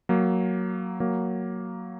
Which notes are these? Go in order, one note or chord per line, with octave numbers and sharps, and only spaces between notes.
F#3 A#3
F#3 A#3